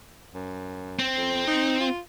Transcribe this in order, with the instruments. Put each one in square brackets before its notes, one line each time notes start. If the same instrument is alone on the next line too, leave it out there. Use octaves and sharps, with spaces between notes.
[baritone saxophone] F#2
[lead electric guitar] C4
[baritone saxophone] F2
D#4
F4